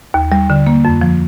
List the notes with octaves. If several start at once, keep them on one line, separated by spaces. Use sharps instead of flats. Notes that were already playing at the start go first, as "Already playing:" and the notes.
D#2
G3
D3
A#3
F2
F3